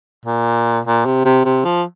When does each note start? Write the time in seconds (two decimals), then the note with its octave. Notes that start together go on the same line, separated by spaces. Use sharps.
0.26 A#2
0.85 A#2
1.06 C3
1.25 C3
1.45 C3
1.65 F3